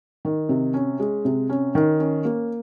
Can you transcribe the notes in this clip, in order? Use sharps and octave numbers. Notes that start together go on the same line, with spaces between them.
D#3
C3
C#4
G#3
C3
C#4
D#3
C#4
A#3